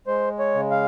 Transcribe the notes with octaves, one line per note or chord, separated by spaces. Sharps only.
G#3 C5
C#5
C#3
F5